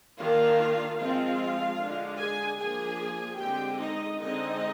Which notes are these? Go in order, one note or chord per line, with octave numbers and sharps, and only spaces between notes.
D#3 A#3 D4 F4 F5
F3 G#3 C4 F4 F5
D3 G#3 D4
G#4 G#5
F3 A#3 D4 G#4 G#5
D3 G#3 C4 G4 G5
D#4 D#5
D3 G#3 C4 D#4 D#5